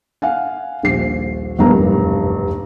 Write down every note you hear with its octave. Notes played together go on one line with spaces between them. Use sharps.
F5 F#5 G#5
D#1 A#1 C7
F1 B1 E2 G2 A#3 A#5